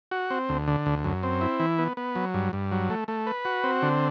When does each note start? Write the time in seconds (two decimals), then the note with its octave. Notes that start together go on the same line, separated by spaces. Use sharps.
0.11 F#4
0.30 C4
0.49 D2
0.68 D3
0.86 D2
1.04 F#2
1.23 C4
1.41 E4
1.60 E3
1.78 B3
1.97 B3
2.15 F#3
2.34 G2
2.53 G2
2.71 F#3
2.90 A3
3.08 A3
3.27 B4
3.45 F#4
3.64 C4
3.82 D3